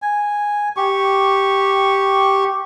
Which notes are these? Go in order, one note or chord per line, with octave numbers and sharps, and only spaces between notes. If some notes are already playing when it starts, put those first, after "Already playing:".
G#5
G4 C#6